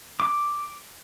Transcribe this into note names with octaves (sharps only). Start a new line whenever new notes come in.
D6